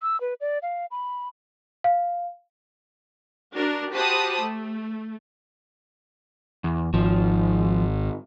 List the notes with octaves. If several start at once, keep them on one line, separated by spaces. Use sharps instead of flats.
E6
B4
D5
F5
B5
F5
D4 F#4 A#4
F#4 G4 C5 A5 B5 D#6
A3
E2
G#1 F3